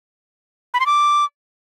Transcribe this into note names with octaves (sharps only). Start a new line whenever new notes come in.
B5
C6
D6